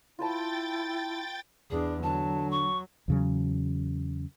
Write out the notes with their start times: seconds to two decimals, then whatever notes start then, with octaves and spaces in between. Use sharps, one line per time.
0.19 E4 F4 B4 G5 A5 A6
1.71 E2 D4 G#4
2.03 D3 F#3 A5
2.51 C#6
3.08 E2 C#3 F#3